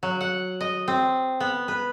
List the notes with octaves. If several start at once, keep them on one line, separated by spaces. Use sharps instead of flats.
F#3
F#5
D#5
C4
B3
B4